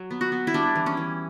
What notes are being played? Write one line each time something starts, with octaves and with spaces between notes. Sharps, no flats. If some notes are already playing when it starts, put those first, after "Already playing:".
Already playing: F#3
B3
F#4
B3
E4
G3 D4
E3
C#4
E3